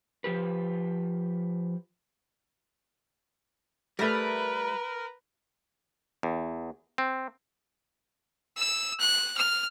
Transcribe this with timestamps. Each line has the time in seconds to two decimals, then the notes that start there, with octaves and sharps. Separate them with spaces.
0.24 F3 G4 B4
3.99 G3 A3 A#4 B4
6.23 E2
6.98 C4
8.58 E6
9.00 F#6
9.38 F6